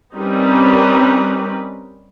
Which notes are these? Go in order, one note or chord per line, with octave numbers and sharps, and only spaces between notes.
G3 C4 C#4 D#4 A#4 B4